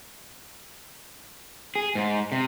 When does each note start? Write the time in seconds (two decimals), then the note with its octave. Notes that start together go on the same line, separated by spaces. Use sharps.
1.75 G#4
1.95 G#2
2.32 C3